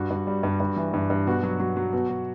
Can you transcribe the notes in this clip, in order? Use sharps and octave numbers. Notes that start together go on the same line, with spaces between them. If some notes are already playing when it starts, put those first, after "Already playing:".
Already playing: G2 F#4
G2
G3
G2
G2
E3
G2
G2
B2 F#4
F#3
F#3
F#3
B2
B2